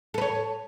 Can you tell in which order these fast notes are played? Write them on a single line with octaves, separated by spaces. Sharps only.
A4 B4 C#5